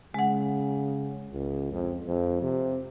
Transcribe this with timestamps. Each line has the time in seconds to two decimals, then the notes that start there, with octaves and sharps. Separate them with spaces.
0.14 C#3 G#3 F#5
1.32 C#2
1.72 F2
2.06 F2
2.42 C3